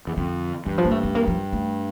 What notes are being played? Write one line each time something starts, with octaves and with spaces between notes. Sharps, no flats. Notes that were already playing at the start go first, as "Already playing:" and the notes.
E2
F2 D3
G2 E3
F3
A#3
A3
A3
A#3
F3
A3